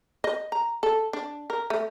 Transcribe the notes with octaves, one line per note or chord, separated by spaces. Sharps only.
D#5
A#5
A4
D4
A#4
A3